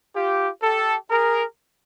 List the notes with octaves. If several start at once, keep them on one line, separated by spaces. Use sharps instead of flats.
F4 G4
G4 A4
G#4 A#4